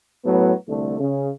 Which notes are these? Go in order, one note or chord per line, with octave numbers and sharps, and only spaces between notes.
A2 F#3 B3
C2 D3 A3
C#3